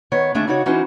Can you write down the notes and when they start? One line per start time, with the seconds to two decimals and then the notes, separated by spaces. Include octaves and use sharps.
0.12 D#3 B3 C#5
0.35 D#2 D3 A3 D4 G#4 E5
0.47 C#3 D4 D#4 F#4 C#5
0.66 E3 C#4 D#4 E4 F#4 C5